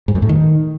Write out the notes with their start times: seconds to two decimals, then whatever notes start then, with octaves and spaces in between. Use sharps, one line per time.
0.08 G#2
0.15 F#2
0.22 A2
0.29 D#3